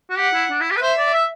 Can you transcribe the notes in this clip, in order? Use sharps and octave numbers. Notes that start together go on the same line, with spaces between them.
F#4
G4 F#5
E4
D4
E4
G4
B4
C5 E5
D5
E5